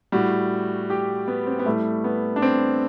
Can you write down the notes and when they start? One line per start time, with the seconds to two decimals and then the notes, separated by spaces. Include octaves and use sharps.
0.12 A2 G3 F#4
0.90 G4
1.28 B3
1.47 C4
1.59 B3
1.66 A2 G3 A3
2.04 B3
2.36 D4
2.42 C4